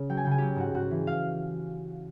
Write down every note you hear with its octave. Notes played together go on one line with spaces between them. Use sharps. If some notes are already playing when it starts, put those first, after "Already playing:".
Already playing: C#3
F#3 G5
G#5
C#3 G5
G#5
F#3 G4 G5
G#2 F#4 F#5
G#2 F#4 F#5
E3
F5